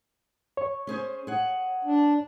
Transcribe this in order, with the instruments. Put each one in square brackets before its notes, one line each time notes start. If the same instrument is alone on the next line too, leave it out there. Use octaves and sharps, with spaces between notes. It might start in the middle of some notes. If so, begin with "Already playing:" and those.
[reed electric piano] C#5
[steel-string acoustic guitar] C#4 G#4 C5
G#4 F#5
[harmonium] D4